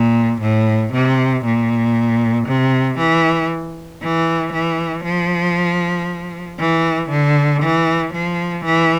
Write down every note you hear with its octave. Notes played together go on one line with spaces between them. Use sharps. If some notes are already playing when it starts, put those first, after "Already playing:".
Already playing: A#2
A2
C3
A#2
C3
E3
E3
E3
F3
E3
D3
E3
F3
E3